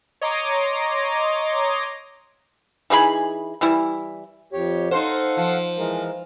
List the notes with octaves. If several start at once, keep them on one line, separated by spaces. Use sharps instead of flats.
C#5 D#5 A#5 C6 D6
E3 D#4 G#4 B5
E3 G3 E4
F2 G4 C#5
D#4 A4 C5 F5 F#5
F3
E3 G#3 A#4